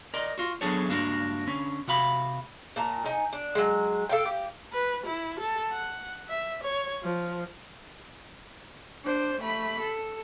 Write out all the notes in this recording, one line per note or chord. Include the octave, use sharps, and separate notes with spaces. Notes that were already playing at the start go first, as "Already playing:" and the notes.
A#4 D5 D#5
F4 F#4
F#3 B3 D4 G#4 A4 C#5
C#2 G2 A#3 D4 F#4 A#4
D3 C#4
C3 F#4 F5 B5
A#2 A5 A#5
D#4 G#5
D4
F#3 G#3
A4 F5 G5
G4
B4
E4
A4
F#5
E5
C#5
F3
D4 C5
A3 B5
A4